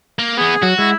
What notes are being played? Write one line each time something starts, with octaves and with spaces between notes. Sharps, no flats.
A#3
E2 B3 G#4
F#3 F#4
G#3 E4